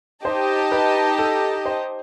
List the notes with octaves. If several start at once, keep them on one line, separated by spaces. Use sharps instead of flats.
D#4 G4 C5 D#5 A5
B4
A4
C5